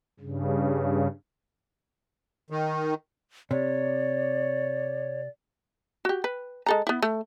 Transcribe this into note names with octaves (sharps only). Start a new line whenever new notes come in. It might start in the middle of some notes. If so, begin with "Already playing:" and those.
G2 C#3
D#3
C3 C#5 D5
F#4 G4
B4
G#3 A4 A#5
B3 E4
A3